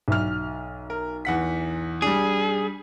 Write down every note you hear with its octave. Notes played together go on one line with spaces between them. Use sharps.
B1 E5 F6
A#4
E2 F#5 B6
G3 D4 G#4